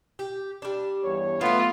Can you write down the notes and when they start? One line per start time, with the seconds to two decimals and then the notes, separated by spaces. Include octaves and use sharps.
0.19 G4
0.62 G3 D4
1.03 E2 G2 C#5
1.41 E3 F#3 A3 B3 F4